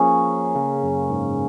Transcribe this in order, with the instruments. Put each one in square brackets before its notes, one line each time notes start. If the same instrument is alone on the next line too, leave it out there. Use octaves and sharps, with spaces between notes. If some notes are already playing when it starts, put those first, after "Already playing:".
Already playing: [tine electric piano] F3 [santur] A#3 C#4 G#4
[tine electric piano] C#3
F#2
G#2